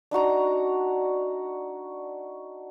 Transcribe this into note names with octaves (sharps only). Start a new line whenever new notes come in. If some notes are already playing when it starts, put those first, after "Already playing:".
D4 D#4 F#4 A#5